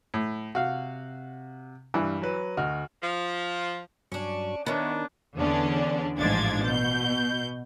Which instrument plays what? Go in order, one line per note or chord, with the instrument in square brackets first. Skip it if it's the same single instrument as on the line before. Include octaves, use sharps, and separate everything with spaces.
[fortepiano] A2
[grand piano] C3 [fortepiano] F#4 F5
[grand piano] G2 G3 [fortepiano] E3
[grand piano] F#3 B4
[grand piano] D2 D#5 F6 [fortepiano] F#4
[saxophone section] F3
[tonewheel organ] G2 F#3 C#6 [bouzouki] C#4 D4
[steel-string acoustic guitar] D#3 [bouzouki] B3 C#4 [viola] D4 [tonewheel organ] C#5 E5 F#5
[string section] E2 D3 B3 C#4 D4
A1 G#2 F3 D4 G#6 A6
B2 G6